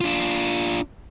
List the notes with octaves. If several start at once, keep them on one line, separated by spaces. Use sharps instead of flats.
D4 F4